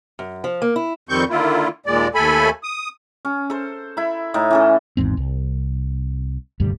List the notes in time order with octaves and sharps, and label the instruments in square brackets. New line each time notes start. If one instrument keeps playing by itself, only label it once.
[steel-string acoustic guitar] F#2
F3
A#3
E4
[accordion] F2 D#3 G3 C4 C#6 G6
D3 D#3 A#3 E4 F4
D#2 A#2 G#3 D5
D#2 A3 A4 G#5 B5
D#6
[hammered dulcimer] C#4
A4 C5
E4 B5
A2 D#4
E3 C#4 A4
[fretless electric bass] G#1 E2 G#2 C4
C2
D#1 D2 G2 G3